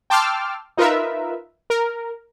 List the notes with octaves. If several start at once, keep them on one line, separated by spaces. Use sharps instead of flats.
G5 A5 C6 D6 E6 F6
D#4 F4 A#4 B4 E5
A#4